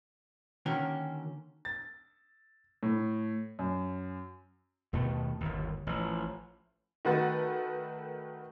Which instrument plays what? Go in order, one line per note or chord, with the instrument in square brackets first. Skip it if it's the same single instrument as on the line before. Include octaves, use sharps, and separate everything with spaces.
[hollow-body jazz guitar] D3 D#3 A#3 C#4 F#4 A#4
[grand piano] A6
A2
F#2
[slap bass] D#2 B2 D#3 A3
G1 D#2
A1 F3
[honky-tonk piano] D#3 A3 F#4 B4 F#5 A6